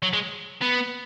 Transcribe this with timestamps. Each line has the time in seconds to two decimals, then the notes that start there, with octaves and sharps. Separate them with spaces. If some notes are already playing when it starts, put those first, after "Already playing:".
0.02 F#3
0.13 G#3
0.61 B3